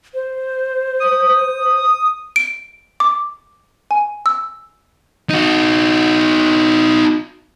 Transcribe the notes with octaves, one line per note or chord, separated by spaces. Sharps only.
C5
D#6
D7
D6
G#5
E6
D#4 F#4